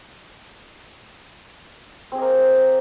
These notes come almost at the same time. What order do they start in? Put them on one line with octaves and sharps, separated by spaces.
C4 G#4 D#5 A#3